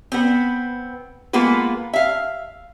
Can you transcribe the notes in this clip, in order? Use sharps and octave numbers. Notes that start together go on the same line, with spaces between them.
B3 C4
G#3 A#3 B3 F4 B4
E5 F5